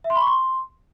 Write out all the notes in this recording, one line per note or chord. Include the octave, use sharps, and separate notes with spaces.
E5
C6
B5
C#6
C6